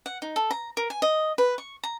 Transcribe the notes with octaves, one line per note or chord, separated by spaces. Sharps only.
F#5
D#4
A4
A#5
A#4
G#5
D#5
B4
C#6
A#5